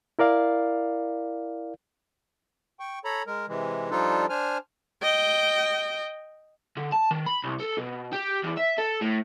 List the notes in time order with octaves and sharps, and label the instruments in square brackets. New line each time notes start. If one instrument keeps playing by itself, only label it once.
[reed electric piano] E4 A#4 D5 F5
[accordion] G5 C#6
A4 C#5 A#5 B5
G#3 A#4
C3 E3 G#3
F3 G3 D4 D#4 F4 A4
D4 C5 G#5 F6
[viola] D#5 G5
[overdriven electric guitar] D3
A5
D#3
B5
C2
A4
B2
G4
E2
E5
A4
A2